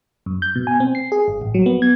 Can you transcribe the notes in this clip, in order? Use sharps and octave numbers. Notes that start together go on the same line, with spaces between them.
F#2
G6
B2
G#5
C4
C7
G#4
G1
A1
F#3
B3
G#6